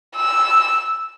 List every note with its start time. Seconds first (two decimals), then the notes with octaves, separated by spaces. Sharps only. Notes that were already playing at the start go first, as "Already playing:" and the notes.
0.16 E6